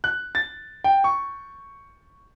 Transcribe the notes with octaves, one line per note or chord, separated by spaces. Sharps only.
F#6
A6
G5
C#6